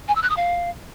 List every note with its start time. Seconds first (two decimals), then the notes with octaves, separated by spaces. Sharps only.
0.08 G#5
0.15 E6
0.22 F#6
0.30 D#6
0.37 F5